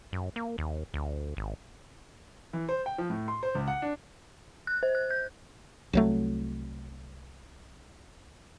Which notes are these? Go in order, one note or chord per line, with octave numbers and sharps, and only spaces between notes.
F#2
A#3
D#2
D2
G#1
E3
C5
G5
F3
A2
C6
C5
C#2
F#5
D4
F#6
C5
F#6
G6
C2 F#3 A3